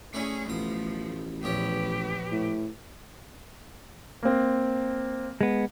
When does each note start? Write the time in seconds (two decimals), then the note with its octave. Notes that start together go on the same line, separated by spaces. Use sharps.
0.14 A3 C#4 D4 E4 G#4
0.48 A1 B2 F3 A3 D#6
1.43 A#1 E2 C#4 G4 B4
2.32 A2
4.23 A#3 C4
5.41 G#3 B3